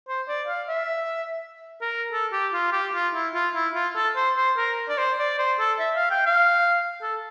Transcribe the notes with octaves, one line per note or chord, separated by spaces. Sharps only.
C5
D5
F5
E5
A#4
A4
G4
F4
G4
F4
E4
F4
E4
F4
A4
C5
C5
A#4
D5
C5
D5
C5
A4
E5
F5
G5
F5
A4